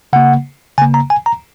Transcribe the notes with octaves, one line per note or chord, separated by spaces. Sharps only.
C#3 A#3 F#5
C#3 A#3 G#5
A#5
G#5
A#5